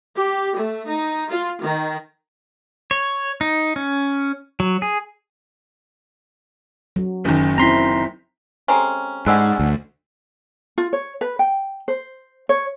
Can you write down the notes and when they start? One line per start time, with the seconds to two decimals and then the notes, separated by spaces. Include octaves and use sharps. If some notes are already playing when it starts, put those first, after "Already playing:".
0.16 G4
0.55 A3
0.89 D#4
1.29 F4
1.60 D#3
2.91 C#5
3.41 D#4
3.76 C#4
4.60 F#3
4.82 G#4
6.96 F#3
7.25 F#1 D#3 C#4
7.58 C4 E4 A#5 C6 B6
8.68 G#3 C4 C#4 G4 A4 A#5
9.26 G#2 D3 G3 C#4 D#5 F#5 E6 F#6
9.60 D2
10.78 F4
10.93 C#5
11.21 B4
11.39 G5
11.88 C5
12.49 C#5